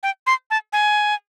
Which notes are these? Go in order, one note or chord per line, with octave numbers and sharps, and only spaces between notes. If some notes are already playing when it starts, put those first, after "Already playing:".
G5
C6
A5
G#5